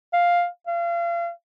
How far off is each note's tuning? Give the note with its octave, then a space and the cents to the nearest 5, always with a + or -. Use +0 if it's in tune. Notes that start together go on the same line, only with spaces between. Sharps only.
F5 +5
F5 -35